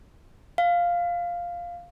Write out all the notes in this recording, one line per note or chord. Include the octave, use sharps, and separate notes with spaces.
F5